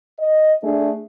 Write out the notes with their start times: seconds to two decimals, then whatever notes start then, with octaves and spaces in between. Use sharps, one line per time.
0.20 D#5
0.64 A3 D4 G#4